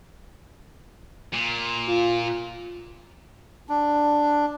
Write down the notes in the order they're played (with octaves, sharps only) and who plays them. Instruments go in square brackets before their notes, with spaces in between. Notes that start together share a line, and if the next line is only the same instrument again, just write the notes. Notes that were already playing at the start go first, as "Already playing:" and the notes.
[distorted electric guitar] A#2
[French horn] F4
[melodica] D4